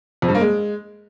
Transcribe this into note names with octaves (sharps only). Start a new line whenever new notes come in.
F2
G2
A#3
G#3